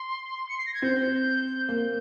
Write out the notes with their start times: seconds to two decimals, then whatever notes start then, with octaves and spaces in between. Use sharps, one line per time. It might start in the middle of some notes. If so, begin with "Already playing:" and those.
Already playing: C6
0.49 C#7
0.58 C7
0.66 A#6
0.74 G#6
0.82 C4 G6
1.69 A#3